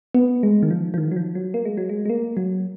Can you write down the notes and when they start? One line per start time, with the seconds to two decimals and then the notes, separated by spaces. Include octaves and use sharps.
0.15 B3
0.43 G#3
0.63 D#3
0.71 F3
0.94 F3
0.98 D#3
1.12 F#3
1.16 F3
1.35 F#3
1.54 A#3
1.65 G#3
1.78 F#3
1.89 G#3
2.05 G#3
2.10 A#3
2.37 F#3